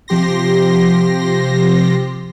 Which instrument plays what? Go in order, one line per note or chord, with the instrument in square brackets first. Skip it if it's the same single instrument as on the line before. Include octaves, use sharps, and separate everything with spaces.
[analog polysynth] C3 F3 G4 C6 A#6